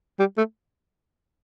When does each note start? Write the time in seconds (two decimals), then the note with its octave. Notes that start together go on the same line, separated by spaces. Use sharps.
0.19 G3
0.37 A3